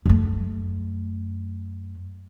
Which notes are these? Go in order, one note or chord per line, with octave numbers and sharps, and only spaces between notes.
F#2 A3